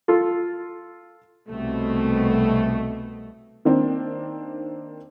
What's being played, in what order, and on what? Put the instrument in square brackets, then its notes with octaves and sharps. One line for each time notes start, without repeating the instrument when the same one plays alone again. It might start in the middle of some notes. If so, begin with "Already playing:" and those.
[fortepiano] F4 A4
[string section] C2 B2 A3
[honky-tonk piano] D#3 A#3 C4 D4